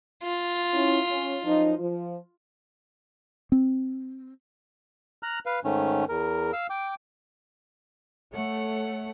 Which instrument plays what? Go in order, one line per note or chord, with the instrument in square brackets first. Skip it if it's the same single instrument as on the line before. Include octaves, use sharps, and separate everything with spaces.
[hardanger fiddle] F4
[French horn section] C#4 E4
C#4
F#2 F3 D#4
F3
[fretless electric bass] C4
[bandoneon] A#5 F6 F#6
B4 F5
G#2 D#3 A3 C#4
E2 A#4
F5 E6
G5 D6
[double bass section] A3 [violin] C#5 F#5